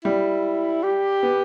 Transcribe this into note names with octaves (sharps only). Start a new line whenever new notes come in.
G3 E4
G4
B3